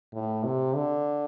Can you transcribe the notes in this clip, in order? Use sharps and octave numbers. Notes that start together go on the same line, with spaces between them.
A2
C3
D3